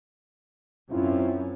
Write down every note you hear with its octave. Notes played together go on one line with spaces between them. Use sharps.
F#2 C4 C#4 E4 F4